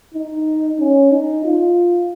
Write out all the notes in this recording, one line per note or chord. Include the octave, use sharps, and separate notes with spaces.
D#4
C#4
D#4
F4